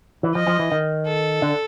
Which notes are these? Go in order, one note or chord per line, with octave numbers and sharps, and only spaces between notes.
E3
F3 D#5
F3
E3
D#3
A4
D3